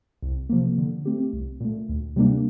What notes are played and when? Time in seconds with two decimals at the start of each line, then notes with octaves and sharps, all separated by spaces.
0.22 C2
0.49 C3 F3 A#3
0.78 D3
1.05 A3 C4 G4
1.33 C2
1.60 A#2 A3
1.89 D2
2.16 C3 G3 A#3 D4